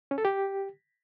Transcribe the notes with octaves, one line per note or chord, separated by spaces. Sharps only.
C#4
A4
G4